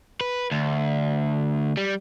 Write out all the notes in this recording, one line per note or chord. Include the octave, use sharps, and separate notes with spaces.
B4
D2
G3